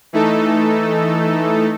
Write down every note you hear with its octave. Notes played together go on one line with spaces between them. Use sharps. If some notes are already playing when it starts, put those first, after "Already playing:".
E3 A3 D#4 A4